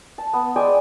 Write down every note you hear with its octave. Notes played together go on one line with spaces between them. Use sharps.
A5
B3
G#3 D5 G5 G#5